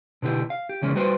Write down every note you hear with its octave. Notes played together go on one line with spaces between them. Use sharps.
B2 D3 E4 G4
F5
G4
C#3 E3 G#3 A#3 C#4
G3 F#4 B4 C5